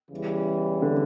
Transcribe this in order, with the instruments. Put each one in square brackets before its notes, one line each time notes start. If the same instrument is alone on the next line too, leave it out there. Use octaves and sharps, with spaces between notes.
[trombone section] E2 C#3 E3 G3
[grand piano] D3